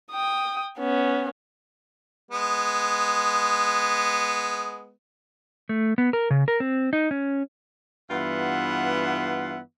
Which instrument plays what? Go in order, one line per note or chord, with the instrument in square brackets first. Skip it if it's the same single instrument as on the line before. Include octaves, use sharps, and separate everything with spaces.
[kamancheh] G5 D#6
B3 C#4
[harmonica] G#3 B3
[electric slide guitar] A3
B3
A#4
C#3
A#4
C4
D#4
C#4
[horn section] G2 E3 B3 F4 E5 F#5